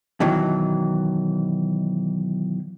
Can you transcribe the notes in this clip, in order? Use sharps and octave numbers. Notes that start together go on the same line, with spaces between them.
B2 D#3 E3 F#3